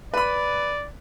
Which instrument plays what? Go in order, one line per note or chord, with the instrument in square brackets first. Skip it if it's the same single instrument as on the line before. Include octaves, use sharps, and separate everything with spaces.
[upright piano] B4 B5 [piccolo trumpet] D5